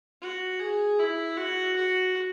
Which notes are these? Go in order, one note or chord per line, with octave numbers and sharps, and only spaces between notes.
F#4
G#4
E4
F#4
F#4